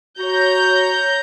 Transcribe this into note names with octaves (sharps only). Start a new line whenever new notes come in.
F#4 C#5 A#5 G6